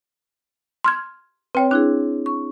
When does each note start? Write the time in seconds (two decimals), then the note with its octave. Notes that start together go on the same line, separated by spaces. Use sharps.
0.84 C6 F6 G#6
1.55 C4 B4 C#5 G5
1.71 D4 E4 G#4 F#6
2.26 C#6